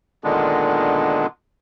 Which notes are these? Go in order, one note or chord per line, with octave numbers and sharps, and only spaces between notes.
A#2 D3 D#3 G#3 B3 D4